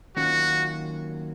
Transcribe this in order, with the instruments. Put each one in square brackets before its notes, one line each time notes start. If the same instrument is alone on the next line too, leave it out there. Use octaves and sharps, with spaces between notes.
[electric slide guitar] D#3 F#3 A#3 C#4 F4 [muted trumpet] F#4